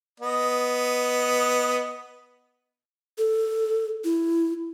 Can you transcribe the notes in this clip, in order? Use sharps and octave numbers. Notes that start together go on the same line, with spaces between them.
B3 D#5
A4
E4